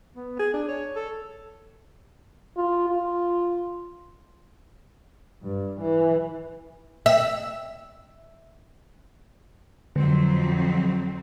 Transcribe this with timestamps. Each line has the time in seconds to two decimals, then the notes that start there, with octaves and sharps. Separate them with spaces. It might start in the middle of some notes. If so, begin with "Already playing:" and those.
0.16 B3
0.39 G#4
0.53 D4
0.68 C#5
0.95 A4
2.57 F4
2.90 F4
5.43 G2
5.81 E3
7.06 E5
9.96 F2 D3 F#3 C4